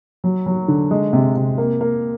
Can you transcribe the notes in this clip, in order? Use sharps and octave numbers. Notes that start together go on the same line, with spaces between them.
F#3
F#3
D3
G#3
C3
C3
A#3
A#3